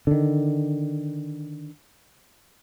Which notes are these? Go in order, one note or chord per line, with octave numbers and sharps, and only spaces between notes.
D3 D#3